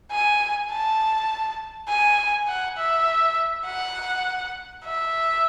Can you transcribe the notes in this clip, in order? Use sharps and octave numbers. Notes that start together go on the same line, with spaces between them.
G#5
A5
G#5
F#5
E5
F#5
E5